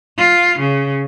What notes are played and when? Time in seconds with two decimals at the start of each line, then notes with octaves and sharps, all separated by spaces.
0.17 F4
0.59 C#3